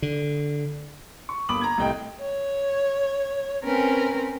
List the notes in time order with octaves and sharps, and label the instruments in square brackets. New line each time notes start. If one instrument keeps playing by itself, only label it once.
[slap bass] D3
[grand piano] C#6
G1 A#3 B5 D6 D#6 F#7
A#5 G#6
C2 A2 D#5 G5
[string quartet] C#5
C4 C#4 A#4 B4